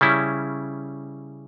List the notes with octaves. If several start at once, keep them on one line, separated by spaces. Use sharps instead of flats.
C#3 G3 C#4 E4